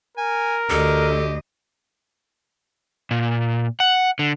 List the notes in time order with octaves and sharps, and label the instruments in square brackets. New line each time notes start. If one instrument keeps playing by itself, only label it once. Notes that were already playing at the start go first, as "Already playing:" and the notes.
[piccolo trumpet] A#4 [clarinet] G#5
[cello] D2 D#5 [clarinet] G4 [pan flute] A4
[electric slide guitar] A#2
F#5
D3